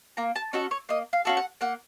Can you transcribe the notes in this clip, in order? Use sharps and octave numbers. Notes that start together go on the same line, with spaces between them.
A#3 A#5
A5
C#4 F#4 A4 D#5
C#5
A#3 D#5
F5
C#4 F#4 A4 F5
F#5
A#3 F#5